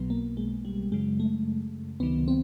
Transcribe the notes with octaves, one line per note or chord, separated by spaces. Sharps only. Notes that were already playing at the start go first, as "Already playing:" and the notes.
Already playing: B1 B2 F#3 B3
A#3
G#3
G3
F#2 C#3 F#3 G#3
A3
C#2 C3 D#3 F#3 B3
C4